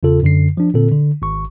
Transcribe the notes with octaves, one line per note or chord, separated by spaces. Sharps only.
E2 C#3 F4 A4
F#2 D3 C7
F3 D4
A#2 D3 C4 A4
D3
G#1 C#6